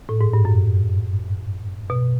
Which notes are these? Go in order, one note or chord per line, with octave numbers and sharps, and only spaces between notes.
A2
G#2
G2
F#2
B2